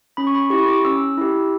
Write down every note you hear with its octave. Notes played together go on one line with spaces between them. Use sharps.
C#4 B5
C#6
B5
E4 G4 C#6
D6
C#4 E6
E4 G4